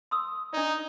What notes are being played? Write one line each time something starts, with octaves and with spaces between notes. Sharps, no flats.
C6 D#6 E6
D4 D#4 D5